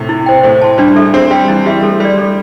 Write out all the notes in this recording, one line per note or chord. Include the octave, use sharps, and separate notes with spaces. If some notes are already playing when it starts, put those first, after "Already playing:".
Already playing: A2 C3
E4
C5 G5
A2 C5
A5 C6
G3 D4
A4 E5
C4 C5
G3 G5 C6
E3 E4
G3 G4 E5 C6
A3 A4
G3 D5 C6
G3 A4